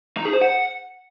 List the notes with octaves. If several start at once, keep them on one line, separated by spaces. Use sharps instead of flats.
D#4
G#4
C5
F#5